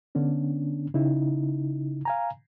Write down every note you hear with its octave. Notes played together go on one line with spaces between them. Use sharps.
D3 B3 C#4 D4
C#3 D#4 E4
F5 G#5 A#5